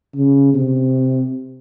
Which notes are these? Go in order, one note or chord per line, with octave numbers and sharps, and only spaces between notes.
C#3
C3